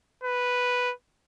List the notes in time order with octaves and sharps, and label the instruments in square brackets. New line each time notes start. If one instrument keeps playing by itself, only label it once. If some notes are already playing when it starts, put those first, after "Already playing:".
[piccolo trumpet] B4